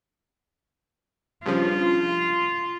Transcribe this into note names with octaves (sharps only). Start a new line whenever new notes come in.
G2 C#3 F3 F4